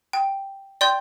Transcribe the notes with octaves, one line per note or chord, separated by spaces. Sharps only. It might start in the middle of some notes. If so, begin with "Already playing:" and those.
G5
D5 G5 C6 G6